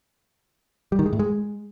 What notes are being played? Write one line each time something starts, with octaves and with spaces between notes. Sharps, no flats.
G3
D#3
G#3
A2
G#3